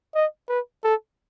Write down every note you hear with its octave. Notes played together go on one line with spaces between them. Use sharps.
D#5
B4
A4